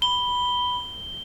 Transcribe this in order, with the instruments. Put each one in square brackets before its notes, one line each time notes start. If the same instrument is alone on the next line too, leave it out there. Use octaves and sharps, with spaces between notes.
[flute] B5 [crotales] G7